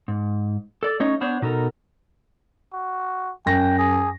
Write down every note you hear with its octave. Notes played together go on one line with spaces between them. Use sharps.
G#2
A4 D5
A3 C#4 D#4 C#5 D#5
B3 D4 C5 C#5
B2 D#4 A4 A#4
F#4
F#2 G5 A#6
G#4